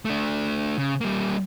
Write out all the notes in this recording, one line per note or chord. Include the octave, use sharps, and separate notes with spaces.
A3 D4
C#3
G3 A#3